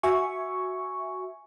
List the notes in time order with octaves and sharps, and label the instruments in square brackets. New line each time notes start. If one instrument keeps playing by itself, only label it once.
[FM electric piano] F#4 E5 G#5 C#6